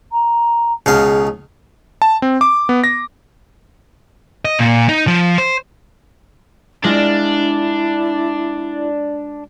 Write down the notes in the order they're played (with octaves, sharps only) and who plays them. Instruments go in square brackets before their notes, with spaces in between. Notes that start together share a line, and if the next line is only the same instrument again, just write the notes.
[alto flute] A#5
[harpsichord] C#2 B2 F5 [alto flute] G#4
[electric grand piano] A5
C4
D6
B3
A#6
[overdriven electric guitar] D#5
A#2
D#4
F3
C5
[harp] G#3 F4 A#6 [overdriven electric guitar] D4 [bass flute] E4